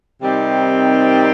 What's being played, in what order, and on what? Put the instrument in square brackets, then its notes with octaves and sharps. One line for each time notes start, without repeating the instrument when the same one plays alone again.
[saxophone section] C3 D#3 G3 C4 D#4